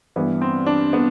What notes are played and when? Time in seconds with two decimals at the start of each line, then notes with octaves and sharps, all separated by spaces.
0.16 G2 E3 B3
0.41 C4
0.66 D4
0.93 B3